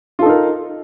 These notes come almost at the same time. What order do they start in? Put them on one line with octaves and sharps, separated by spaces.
F4 A4 D#4 A#4